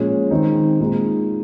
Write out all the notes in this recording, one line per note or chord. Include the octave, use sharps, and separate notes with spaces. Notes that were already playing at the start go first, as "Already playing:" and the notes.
Already playing: A#2 F3 G#3 C#4
D#3 G#3 C4 D#4
A#2 G#3 D#4